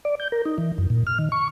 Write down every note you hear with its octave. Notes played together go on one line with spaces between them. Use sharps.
D5
G6
A#4
D#4
E3
F#2
A#2
F6
D#3
C#6